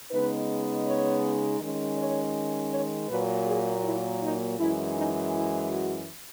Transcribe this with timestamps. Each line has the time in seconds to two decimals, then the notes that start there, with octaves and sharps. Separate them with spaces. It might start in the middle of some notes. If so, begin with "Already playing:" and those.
0.11 C#3 G#3 B3 D#4 B4
0.86 C#5
1.61 D#3 G#3 C#4
1.98 C#5
2.72 C#5
3.09 A#2 F#3 A#3 B4
3.47 G#4
3.85 E4
4.22 D#4
4.59 F#2 E3 G#3 E4
4.96 D#4
5.34 E4
5.70 F#4